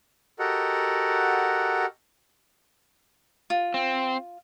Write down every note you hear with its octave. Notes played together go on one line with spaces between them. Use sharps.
F#4 G4 A4 A#4 D#5 F#5
F4
C4